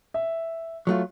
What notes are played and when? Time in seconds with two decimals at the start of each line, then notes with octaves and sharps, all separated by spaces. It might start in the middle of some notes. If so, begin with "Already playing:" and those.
0.14 E5
0.87 F#3 A3 F4